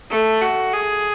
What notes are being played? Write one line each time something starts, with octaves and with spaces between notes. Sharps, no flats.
A3
F#4
G#4